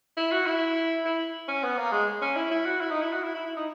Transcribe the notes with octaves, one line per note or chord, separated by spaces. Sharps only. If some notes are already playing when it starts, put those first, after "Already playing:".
E4
F#4
E4
E4
C#4
B3
A#3
G#3
C#4
E4
E4
F#4
E4
D#4
E4
F#4
E4
E4
E4
D#4